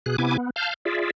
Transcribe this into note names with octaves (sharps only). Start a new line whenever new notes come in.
B2 G#4 F#6
C3 B3 E4 G#5 D6
B3
F5 A5 F6 G6
F4 G#4 D5 E5